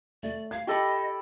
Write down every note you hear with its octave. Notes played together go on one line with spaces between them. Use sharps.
A3 D5
F5 G#6
G4 A4 D#5 B5